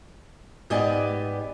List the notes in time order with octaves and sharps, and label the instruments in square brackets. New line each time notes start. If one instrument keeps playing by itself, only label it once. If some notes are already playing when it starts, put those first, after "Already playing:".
[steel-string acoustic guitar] G#2 B3 G4 D5 D#5 G#5